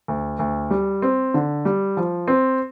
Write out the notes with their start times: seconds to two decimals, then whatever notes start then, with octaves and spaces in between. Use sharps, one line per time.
0.08 D2
0.39 D2
0.71 G3
1.02 C4
1.34 D3
1.65 G3
1.97 F3
2.28 C4